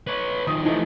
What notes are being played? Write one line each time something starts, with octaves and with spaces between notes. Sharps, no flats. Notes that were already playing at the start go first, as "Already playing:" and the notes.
B4 C#5
D#3 F3 D#6
E3 F3 A3 D#4